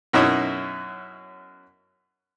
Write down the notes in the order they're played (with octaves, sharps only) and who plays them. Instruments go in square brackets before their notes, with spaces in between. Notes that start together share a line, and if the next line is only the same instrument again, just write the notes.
[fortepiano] F#2 B2 C#4 D#4 E4